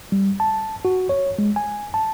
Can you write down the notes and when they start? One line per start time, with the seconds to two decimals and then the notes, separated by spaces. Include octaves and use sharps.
0.12 G3
0.40 A5
0.85 F#4
1.09 C#5
1.39 G#3
1.56 G#5
1.94 A5